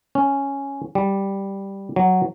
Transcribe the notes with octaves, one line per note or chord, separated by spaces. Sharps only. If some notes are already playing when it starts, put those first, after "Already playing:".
C#4
G3
F#3